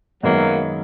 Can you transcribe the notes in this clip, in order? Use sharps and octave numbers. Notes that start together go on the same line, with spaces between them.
F#2 D#3 F#3 G#3 A#3 B3